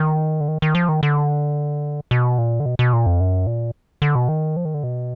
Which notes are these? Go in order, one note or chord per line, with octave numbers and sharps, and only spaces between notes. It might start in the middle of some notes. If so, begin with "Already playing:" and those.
Already playing: D#3
D3
D#3
D#3
F3
D#3
D3
B2
A#2
D3
B2
B2
A#2
F2
F#2
A#2
D3
B2
D#3
F3
D#3
D3
B2